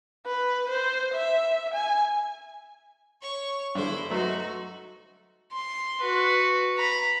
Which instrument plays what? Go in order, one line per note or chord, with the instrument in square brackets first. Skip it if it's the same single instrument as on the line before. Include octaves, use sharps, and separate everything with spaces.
[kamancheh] B4
C5
E5
G#5
[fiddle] C#5 C#6
[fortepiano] G2 D3 [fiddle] E4 C5
[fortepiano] F#3 A3 C6 [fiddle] D#4 F#4
[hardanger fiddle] C6
F#4 B4
A#5 B5